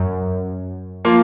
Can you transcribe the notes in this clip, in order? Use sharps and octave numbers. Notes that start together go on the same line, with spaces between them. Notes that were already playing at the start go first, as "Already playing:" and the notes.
Already playing: F#2
F3 A#3 F4